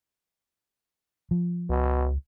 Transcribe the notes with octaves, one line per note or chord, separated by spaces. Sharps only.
F3
C#2 B2